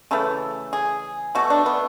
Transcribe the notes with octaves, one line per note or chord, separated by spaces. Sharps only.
C#3 E3 A3 A4
G#4
B2 A3 F#4
D4
B3